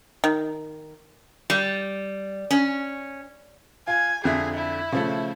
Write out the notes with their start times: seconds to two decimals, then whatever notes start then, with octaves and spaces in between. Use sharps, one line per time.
0.24 D#3
1.50 G3
2.51 C#4
3.87 F4 G#5
4.24 F2 D3 G#4 E5
4.54 E4
4.92 C#3 F3 A3